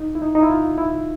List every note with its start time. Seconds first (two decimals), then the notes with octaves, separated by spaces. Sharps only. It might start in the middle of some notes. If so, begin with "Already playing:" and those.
Already playing: D#4
0.15 E4
0.22 D#4
0.35 D#4
0.42 E4
0.50 F4
0.78 E4